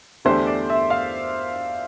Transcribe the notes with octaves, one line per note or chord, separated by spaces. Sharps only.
E2 D3 A3 D4 G4 C5
D5
E5
F5